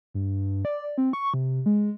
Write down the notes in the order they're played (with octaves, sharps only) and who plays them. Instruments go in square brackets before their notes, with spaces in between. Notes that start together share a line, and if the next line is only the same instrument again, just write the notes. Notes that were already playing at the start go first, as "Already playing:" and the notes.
[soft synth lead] G2
D5
C4
C#6
C3
G#3